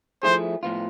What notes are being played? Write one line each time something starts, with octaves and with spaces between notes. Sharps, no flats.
F3 A3 E4 G#4 C5
A2 F3 B3 F4